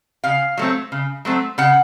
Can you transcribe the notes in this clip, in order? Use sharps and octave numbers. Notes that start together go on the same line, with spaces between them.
C#3 F5
F#3 A3 C4
C#3
F#3 A3 C4
C#3 F#5